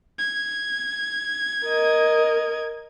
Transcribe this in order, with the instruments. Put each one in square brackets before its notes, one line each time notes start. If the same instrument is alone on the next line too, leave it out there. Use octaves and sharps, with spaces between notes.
[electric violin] G#6
[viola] A#4 D#5